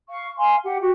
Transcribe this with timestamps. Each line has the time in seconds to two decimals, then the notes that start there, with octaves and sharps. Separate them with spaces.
0.08 F5 C#6
0.38 F5 G#5 C6
0.63 G4 F#5
0.80 F#4 G4